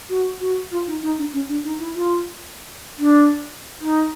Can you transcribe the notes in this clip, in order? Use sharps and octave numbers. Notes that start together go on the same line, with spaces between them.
F#4
F#4
F4
D#4
D#4
D4
C#4
D4
D#4
E4
F4
D4
D#4